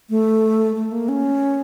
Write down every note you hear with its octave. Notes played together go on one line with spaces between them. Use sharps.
A3
A3
A#3
C#4